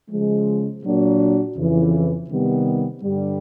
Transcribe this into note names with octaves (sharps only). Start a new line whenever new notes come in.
C#3 F3 G#3
A#2 F#3 A#3 D4 F#4
F2 C#3 E3
C3 D#3 G3 B3
G2 D3 G3